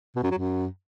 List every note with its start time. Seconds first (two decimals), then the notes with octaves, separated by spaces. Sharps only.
0.16 B2
0.23 F#2
0.31 F#3
0.38 F#2